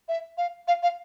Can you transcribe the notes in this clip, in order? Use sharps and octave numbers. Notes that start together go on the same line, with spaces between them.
E5
F5
F5
F5